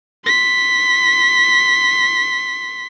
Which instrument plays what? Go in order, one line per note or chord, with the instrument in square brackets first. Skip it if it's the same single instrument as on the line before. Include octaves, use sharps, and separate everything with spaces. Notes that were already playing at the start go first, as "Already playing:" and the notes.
[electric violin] C6 B6